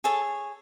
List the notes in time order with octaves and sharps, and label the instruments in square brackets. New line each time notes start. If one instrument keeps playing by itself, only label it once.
[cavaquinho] G#4 A4 C#5 A5